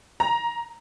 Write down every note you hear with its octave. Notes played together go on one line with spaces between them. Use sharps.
A#5